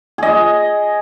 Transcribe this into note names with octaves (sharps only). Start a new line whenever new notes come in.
G#4 D#5